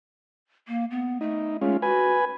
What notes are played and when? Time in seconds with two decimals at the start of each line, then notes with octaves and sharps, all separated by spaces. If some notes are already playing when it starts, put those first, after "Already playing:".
0.68 A#3
0.91 B3
1.21 A3 D#4
1.62 G#3 A3 C#4 F4
1.82 F#4 B4 G#5